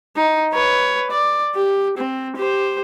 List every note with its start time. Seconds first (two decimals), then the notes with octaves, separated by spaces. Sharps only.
0.17 D#4
0.53 B4 C#5
1.11 D5
1.55 G4
1.98 C4
2.36 G4 C5